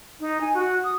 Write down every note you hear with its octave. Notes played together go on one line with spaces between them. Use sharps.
D#4
G#5
F#4
D#6